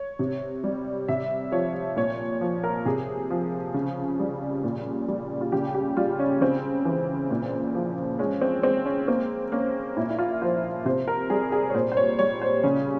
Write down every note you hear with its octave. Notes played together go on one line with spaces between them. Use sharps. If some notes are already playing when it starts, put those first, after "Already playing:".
Already playing: C#5
C3
G3
C3 E5
F3 C#5
A#2 C#5
F3
A#4
C3 G#4
F3
C#3
G3
A#2
G3
F4
C#3 G4
G4
G3 F4
C#4
C#3 C4
E3
A#2
F3
G#3 C#4
C4
G#3 C4
C#4
A#3 C4
A#3 C#4
A#2 E4
E4
F4
F3 C5
C3 C5
A#4
G3 G#4
G#4
C#5
A#2 C5
C5
C#5
G3 C#5
C5
C#3 C#4